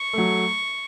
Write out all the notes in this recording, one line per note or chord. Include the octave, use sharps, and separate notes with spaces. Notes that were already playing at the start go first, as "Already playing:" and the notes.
Already playing: C#6
F#3 A3